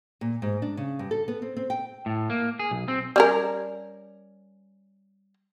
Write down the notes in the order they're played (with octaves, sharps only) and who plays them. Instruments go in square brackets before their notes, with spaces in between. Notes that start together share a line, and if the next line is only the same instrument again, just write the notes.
[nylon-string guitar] A#2
G#2
D4
C#3
G2
A4
B3
C4
C4
G5
[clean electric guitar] A2
A#3
G#4
B1
C4
[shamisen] G3 C#4 A#4